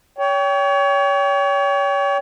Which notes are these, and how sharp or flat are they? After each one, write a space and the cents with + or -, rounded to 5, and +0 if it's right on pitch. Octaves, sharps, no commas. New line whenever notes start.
C#5 +30 G5 +0